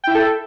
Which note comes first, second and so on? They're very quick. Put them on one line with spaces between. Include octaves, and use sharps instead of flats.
G5 E4 E5 A4